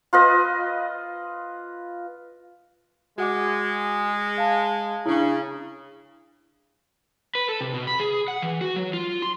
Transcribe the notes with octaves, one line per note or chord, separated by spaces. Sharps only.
F4 B4 D#5
G#3 F#4 F#5 D6
F5 A5
C#3 D4 E4
B4
A4
C3
B2
B5
G#4
F#5
E3
F#4
F#3
F4
C6